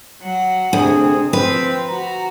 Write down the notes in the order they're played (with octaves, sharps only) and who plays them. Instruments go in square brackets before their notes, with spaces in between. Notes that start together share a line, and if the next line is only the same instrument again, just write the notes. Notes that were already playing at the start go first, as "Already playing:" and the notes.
[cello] F#3 F#5
[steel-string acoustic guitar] D2 [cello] C3 [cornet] G#4
[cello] F3 [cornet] C4 [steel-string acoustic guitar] B4
[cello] F#4 [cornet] A#5